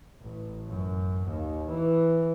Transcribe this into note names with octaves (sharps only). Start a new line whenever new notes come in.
A1
F#2
D#2
E3